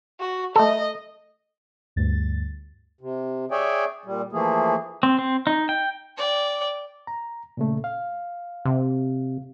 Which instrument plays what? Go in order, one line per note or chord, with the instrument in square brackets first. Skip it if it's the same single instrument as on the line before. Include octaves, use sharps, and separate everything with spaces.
[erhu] F#4
[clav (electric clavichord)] A3 A4 [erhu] D#5
[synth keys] D2 G2 A6
[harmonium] C3
G#4 C#5 D5 E5 G5 G#5
A#2 G3
E3 F3 A3 A#3 G#4
[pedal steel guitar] C4
C4
D#4
G5
[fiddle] D5 G5
[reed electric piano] A#5
A#2 C#3 A3
F5
[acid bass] C3